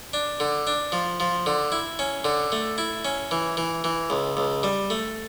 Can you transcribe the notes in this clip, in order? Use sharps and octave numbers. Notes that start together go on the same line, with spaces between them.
D4
D3
D4
F3
F3
D3
E4
C#4
D3
A3
E4
C#4
E3
E3
E3
C#2
C#2
G3
A3